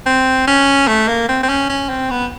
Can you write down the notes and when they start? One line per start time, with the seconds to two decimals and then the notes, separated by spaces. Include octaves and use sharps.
0.06 C4
0.47 C#4
0.87 A3
1.08 A#3
1.29 C4
1.43 C4
1.49 C#4
1.69 C#4
1.89 C4
2.10 B3